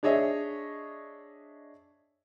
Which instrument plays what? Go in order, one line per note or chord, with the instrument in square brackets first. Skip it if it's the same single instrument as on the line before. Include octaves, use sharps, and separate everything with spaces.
[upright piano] D4 G#4 C#5 D#5 E5